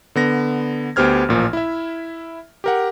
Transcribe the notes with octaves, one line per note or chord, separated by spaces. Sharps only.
D3 B3 A#6
D2 B3 G4 C5 F6 G#6
A1 A#2 F3
E4 E5
G4 A#4 F#5